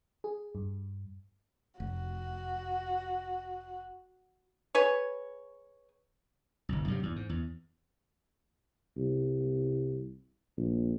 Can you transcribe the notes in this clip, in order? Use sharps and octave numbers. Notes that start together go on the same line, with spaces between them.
G#4
G2
F1 F#4
G#4 B4 C#5
G1 C2
G2 C3 F#3
E2
G#2
E2
C2
A#1